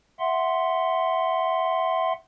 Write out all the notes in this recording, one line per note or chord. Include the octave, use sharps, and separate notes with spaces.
E5 F#5 C6